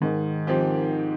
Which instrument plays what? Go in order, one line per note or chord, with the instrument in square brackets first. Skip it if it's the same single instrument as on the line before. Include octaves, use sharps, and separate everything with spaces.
[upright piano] G#2 [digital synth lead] D#3
[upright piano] F3 C4 G4